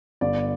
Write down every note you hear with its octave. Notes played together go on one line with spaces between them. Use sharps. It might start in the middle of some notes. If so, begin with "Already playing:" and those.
G1 D5